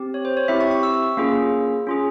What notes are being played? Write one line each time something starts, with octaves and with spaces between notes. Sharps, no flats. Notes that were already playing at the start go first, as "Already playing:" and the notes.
Already playing: C4 G4
C#5
C5
C#5
C4 E4 G4 E5
C#6
C#6
E6
A#3 C#4 F4 G#4
C#4 F4 G#4